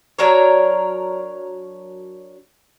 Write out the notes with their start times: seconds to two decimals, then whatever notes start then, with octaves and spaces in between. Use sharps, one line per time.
0.19 F#3 D4 A#4 C#5